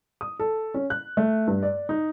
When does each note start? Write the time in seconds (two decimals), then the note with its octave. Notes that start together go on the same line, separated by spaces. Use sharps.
0.21 D#6
0.40 A4
0.74 C#4
0.90 F#6
1.17 A3
1.47 G2
1.63 D5
1.89 D#4